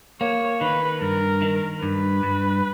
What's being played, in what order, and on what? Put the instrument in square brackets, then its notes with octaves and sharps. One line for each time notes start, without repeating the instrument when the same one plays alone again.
[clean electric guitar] A#3 [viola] C#5
[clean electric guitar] D#3 [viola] B4
[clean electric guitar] G2 [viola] A#4
[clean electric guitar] D#3
[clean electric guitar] G2 [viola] B4
[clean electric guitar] G2